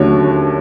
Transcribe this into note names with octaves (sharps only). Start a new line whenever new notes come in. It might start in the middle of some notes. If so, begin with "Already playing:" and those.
Already playing: D#2 D3 F#3 A3 C#4 C#5